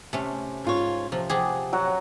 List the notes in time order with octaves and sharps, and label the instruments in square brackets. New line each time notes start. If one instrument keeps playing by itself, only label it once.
[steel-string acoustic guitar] C3 [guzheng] A3 C#4
[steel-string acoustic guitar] G#2 F4 C#5
[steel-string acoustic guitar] C3 [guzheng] F3
[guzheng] F3 G4 G#4 [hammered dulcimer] F#5
[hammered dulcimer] F#3 F#5